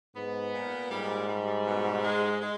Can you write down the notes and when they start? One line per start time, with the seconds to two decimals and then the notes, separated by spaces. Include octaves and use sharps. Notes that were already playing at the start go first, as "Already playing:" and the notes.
0.15 G#2 B3
0.54 A#2
0.91 G#2 G3
1.29 G3
1.67 B2
2.04 G#3
2.41 G#3